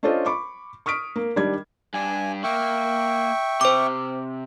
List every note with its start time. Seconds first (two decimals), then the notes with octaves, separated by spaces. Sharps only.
0.03 C#4 D4 F4 A4 C5 D#5
0.26 B5 C#6 D6
0.86 C#6 D#6 F6 B6 D7
1.16 A#3
1.36 D#3 G3 D4 G#6
1.94 G2 D4 G#5
2.44 A#3 E5 G5 C#6
3.61 C3 C5 D6